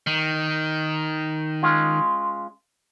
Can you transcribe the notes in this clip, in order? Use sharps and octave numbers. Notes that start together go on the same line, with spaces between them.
D#3
G#3 C#4 F4